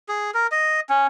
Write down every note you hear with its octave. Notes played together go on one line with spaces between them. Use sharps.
G#4
A#4
D#5
C#4